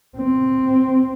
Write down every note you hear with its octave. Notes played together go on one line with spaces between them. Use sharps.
C4